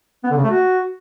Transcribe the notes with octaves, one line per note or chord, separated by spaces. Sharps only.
B3
D3
C#3
A3
F#4